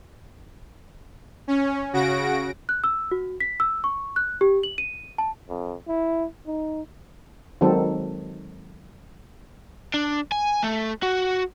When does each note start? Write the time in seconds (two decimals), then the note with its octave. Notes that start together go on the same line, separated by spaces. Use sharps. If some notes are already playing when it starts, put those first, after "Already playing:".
1.48 C#4
1.93 C#3 F#4 A#6 D7
2.69 F#6
2.84 E6
3.11 F#4
3.40 B6
3.60 E6
3.84 C#6
4.16 F#6
4.41 G4
4.63 F#7
4.78 D#7
5.18 A5
5.49 F2
5.88 E4
6.46 D#4
7.61 D#3 F#3 G#3 C4 A4
9.94 D4
10.32 G#5
10.63 A3
11.03 F#4